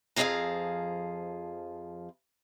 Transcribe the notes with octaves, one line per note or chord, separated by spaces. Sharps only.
F2 F3 G#3 G#4 F5 A#5